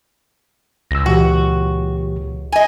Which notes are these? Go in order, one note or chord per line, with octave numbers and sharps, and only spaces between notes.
C#2 E6 A#6
A#2 E3 F#4 G4
D#5 G#5